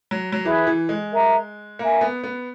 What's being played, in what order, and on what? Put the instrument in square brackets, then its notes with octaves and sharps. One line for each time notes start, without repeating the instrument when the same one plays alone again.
[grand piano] F#3
F#3
[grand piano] E3 [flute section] G#4 B4 E5 B5
[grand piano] E3
G#3
[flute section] A#4 E5 A#5
[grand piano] A#3 [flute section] A#4 E5 G#5
[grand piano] B3
B3